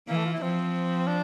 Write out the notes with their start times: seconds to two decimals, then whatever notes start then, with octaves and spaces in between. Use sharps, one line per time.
0.08 E3 A#3
0.17 A3
0.25 F4
0.33 E4
0.41 F3 C4
1.07 D4